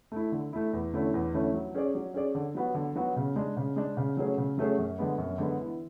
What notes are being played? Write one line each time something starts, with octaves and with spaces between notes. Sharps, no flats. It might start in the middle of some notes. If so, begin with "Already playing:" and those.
A3 E4
D3
A3 E4
E2
D3 A3 C#4 E4
E2
D3 A3 C#4 E4
F#3
C#4 G#4 D5
F#3
C#4 G#4 D5
D3
F#3 B3 F#4
D3
F#3 B3 F#4
C#3
G#3 D4
C#3
G#3 D4
C#3
F#3 A3 C#4 G#4
C#3
F#3 A3 C#4 G#4
F#2
D3 G#3 B3
F#2
D3 G#3 B3
E3